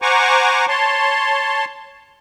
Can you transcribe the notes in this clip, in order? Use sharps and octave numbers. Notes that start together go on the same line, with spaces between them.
C5 F#5 G#5 A#5 C#6 D6
C#5 A5 C6